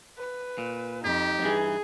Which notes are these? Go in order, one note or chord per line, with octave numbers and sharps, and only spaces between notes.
B4
A#2
F2 D#4 G4
G2 E3 G#4